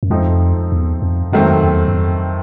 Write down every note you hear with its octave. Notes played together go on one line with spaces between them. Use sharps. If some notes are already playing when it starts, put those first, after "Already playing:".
F#2
F2 F3 A3 C4 D#4
E2
F2
F2 D#3 F#3 A3 C4
E2
F#2
F2